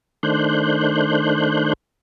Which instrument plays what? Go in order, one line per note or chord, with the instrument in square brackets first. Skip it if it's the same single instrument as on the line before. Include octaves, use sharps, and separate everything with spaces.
[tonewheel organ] D#3 A3 D4 C5 F#6 G6